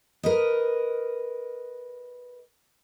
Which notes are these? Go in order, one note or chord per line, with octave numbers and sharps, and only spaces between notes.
A#4 B4 D#5